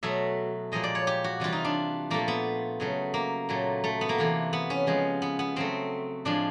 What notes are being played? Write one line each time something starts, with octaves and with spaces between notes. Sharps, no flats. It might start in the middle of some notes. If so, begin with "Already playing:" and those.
B2 F#3 A3 E5
A#2 F3 G#3 D#5
D5
C#5
G4
F#4
C3 E3 G3 F4
D#4
D4
A#2 F3 A3 A#3
B3
C#3 F#3 A3
A#3
A#2 F#3 A3
A3
B3
A#3
C3 E3 A3
B3
C#4
C#3 F3 G#3
B3
B3
C#3 F#3 A3 C4
A2 F3 G#3 D4